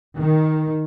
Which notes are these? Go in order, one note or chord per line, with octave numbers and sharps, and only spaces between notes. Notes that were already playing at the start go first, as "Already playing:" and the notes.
D#3